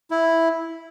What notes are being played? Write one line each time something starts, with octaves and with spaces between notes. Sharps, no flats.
E4